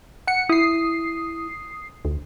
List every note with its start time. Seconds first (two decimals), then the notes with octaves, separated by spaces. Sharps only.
0.27 F#5 C#7
0.49 E4 D#6 C7
2.05 D2